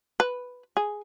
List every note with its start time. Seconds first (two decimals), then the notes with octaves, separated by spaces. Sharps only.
0.20 B4
0.77 G#4